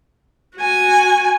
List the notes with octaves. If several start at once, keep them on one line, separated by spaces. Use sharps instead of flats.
F#4 G#5